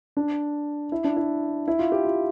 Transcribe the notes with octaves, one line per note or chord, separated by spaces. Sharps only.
D4
E4
D4
E4
E4
F4
G4
F4